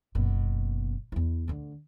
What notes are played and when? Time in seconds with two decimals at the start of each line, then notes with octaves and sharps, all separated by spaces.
0.15 F#1 B2
1.12 E2 E4
1.48 D2 D3